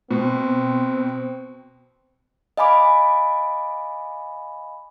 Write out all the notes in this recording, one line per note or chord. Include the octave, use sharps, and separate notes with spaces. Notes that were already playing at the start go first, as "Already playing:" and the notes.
B2 C4
D#5 F5 G#5 B5 D6